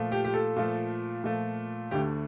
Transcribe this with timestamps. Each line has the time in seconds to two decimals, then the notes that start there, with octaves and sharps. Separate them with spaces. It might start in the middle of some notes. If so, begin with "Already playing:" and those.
Already playing: A#2 F3 A3
0.12 G4
0.25 G4
0.34 A4
0.56 A#2 F3 A3
1.24 A#2 F3 A3
1.91 D2 D3 A3 G4